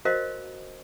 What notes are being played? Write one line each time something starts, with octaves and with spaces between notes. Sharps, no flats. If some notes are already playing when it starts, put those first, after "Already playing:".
F#4 A#4 C5 D#5 F5